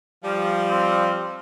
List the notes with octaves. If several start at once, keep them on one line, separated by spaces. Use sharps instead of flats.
F3 G3
C4